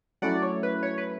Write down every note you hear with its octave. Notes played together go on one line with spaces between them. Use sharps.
F#3 A3 C#4 E4 D5 F#5
C#5
B4
C#5
B4